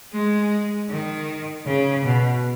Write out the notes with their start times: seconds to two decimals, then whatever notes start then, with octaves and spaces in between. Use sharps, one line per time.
0.13 G#3
0.90 D#3
1.66 C#3
2.04 B2